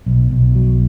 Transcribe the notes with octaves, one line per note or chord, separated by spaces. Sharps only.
B1
B1
F#3